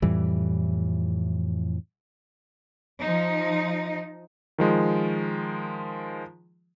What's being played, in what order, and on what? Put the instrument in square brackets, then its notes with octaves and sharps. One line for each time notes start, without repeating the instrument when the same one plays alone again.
[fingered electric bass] F2 A2 E3 G3
[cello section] F3 D#4
[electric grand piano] D#3 F3 G#3